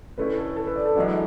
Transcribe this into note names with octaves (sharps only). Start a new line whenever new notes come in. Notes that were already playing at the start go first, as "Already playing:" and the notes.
D3 A3 C#4 E4 B4
A4
A4
B4
D5
A4
F#2 E3 G#3 D4 F#4